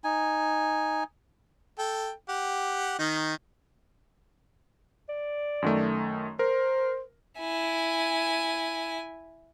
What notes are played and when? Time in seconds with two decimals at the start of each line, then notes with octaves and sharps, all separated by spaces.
0.04 D#4 G#5
1.78 A4 G5
2.29 G4 F#5
2.99 D#3 D#4
5.09 D5
5.62 F#2 D#3 A3
6.39 A#4 C5
7.39 E4 G#5